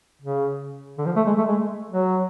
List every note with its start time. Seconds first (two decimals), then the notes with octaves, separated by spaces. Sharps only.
0.22 C#3
0.98 D3
1.06 F3
1.16 A3
1.27 G#3
1.38 A3
1.48 G#3
1.91 F#3